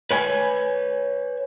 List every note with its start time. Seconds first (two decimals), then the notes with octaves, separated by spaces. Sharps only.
0.11 B4 C#5 G#5